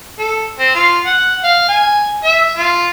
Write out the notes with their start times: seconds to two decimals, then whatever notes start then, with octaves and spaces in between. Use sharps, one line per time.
0.19 A4
0.59 C4
0.74 F4
1.05 F#5
1.44 F5
1.68 G#5
2.23 E5
2.57 F4